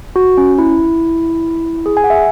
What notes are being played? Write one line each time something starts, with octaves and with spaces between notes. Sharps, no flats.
F#4
C#4
E4
G#4
G#5
F#5
E5